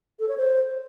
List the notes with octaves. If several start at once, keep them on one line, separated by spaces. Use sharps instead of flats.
A4
C#5
C5